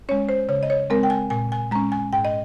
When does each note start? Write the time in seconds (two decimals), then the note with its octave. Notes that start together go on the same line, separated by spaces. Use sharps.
0.09 G#3 C#4 C#5
0.29 C5
0.49 C#3 C#5
0.63 D#5
0.70 C#5
0.90 G#3 C4 A#4
1.03 G5
1.10 G#5
1.30 A#2 G#5
1.52 G#5
1.71 G#3 C#4 A#5
1.92 G#5
2.13 G#2 G5
2.25 D#5